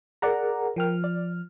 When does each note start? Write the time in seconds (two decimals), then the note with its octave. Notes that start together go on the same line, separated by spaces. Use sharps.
0.22 G#4 A#4 D5 F#5 A#5
0.76 F3 A#4 G5 F6
1.04 D5